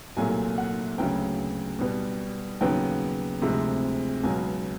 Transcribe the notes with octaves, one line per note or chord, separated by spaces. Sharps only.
C2 A#2 F#3 A3 G#5
F#5
D2 C#3 F#3 B3 G5
B2 G3 B3
D#2 C#3 F#3 B3 G5
D2 C3 F3 G#3
C#2 B2 F#3 G#5